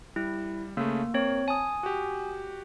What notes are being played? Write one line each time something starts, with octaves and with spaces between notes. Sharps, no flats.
G3 E4
C#3 A3 A#3
A#3 C4 C#5
G#5 A5 D#6
F#4 G4